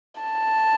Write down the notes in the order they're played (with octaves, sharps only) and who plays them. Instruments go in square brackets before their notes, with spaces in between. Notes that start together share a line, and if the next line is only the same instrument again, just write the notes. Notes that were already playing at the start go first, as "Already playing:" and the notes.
[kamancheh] A5